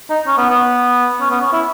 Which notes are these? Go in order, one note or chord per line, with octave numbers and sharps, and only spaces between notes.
D#4
C#4
B3
B3
C#4
B3
C#4
E4